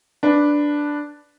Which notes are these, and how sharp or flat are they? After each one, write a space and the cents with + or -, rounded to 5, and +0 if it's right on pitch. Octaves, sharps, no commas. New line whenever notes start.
D4 +0 B4 +0